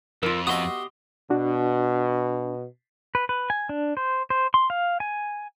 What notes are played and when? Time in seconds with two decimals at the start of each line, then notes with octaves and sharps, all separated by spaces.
0.23 F2 F4 A#4 E6
0.47 B3 F#4 G4 D#5 E5 C6 D#6
1.30 B2 D4 F#4
3.15 B4
3.29 B4
3.50 G#5
3.69 D4
3.97 C5
4.30 C5
4.54 C6
4.70 F5
5.00 G#5